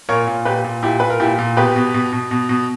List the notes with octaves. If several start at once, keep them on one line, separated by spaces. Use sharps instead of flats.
A#2 A#4 C#5
A#2
A#2 G4 B4
A#2
A#2 E4 G4
A#2 B4
A#4
A#2 E4 G4
A#2
B2 G4 B4
B2
B2
B2
B2
B2